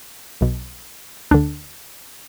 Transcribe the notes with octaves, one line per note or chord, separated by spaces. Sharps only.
B1 B2
D2 D3 D4